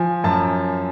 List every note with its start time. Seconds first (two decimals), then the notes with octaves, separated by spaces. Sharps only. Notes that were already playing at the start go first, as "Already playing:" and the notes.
Already playing: F3 G#5
0.24 F#2 A5